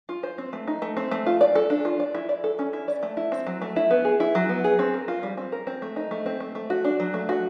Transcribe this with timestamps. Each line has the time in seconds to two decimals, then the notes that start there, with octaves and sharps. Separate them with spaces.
0.09 F4
0.23 C5
0.38 C4
0.53 A3
0.68 D#4
0.82 A3
0.97 C4
1.11 A3
1.26 F4
1.41 D5
1.55 A4
1.70 D4
1.85 F4
2.00 D5
2.15 E4
2.29 D5
2.44 A4
2.59 C#4
2.73 E4
2.88 D5
3.03 A3
3.17 E4
3.32 C4
3.47 F#3
3.62 A3
3.76 E4
3.91 B3
4.05 G#4
4.20 E4
4.35 F#3
4.49 B3
4.64 G#4
4.79 C4
4.94 A#4
5.08 F4
5.23 G3
5.37 C4
5.52 A#4
5.67 C4
5.82 A3
5.96 D#4
6.11 A3
6.26 C4
6.40 A3
6.55 A3
6.70 F#4
6.85 D4
7.00 F#3
7.14 A3
7.29 F#4